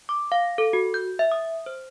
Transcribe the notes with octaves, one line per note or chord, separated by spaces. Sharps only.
D6
F5
A4
F#4
G6
E5
D#6
C5